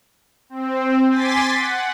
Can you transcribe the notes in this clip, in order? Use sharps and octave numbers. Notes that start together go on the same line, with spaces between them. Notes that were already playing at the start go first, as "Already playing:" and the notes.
C4
G#5 C6 D6 A6 B6
F#5